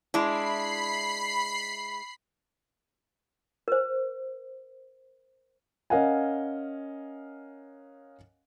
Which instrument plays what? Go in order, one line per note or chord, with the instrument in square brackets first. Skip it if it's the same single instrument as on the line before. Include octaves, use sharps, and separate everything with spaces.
[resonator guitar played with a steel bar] G#3 D4 E4 [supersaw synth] B5 C7
[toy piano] A#4 C5
[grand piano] C#4 A#4 D#5 F5 F#5 G#5